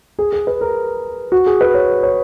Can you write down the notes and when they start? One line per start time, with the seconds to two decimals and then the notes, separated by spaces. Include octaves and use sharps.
0.19 G#4
0.32 G#4
0.47 B4
0.61 A#4
1.32 F#4
1.46 G#4
1.61 B4
1.74 C#5
2.03 C#5